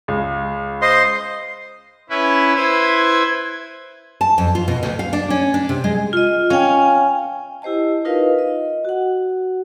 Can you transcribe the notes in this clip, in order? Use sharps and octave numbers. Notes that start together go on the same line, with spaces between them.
C#2
C5 D#5 C6
C#4 E4 B4 E5
E4 B4 C5 G#6
A5
F2
F4
B2
D2
F5
D4
C#4
D4
C3
G#3
F4 D#5
C#4 F5 G5
E4 G4 C5 D#5 A5
D#4 F4 A#4 B4 D#5 F5
D#5
F#4 F#5